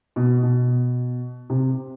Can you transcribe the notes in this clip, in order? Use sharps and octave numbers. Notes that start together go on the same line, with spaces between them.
B2
B2
C3